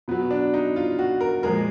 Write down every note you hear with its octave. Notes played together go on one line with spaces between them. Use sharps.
B2 F#3 B3
D4
D#4
F4
F#4
A#4
A#2 F3 G#3 A#4